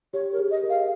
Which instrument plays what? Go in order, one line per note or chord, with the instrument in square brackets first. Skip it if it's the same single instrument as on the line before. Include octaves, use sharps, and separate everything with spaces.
[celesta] G4 [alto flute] C#5
[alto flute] A#4
[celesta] G#4
[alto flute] D#5
[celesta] A#4
[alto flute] F5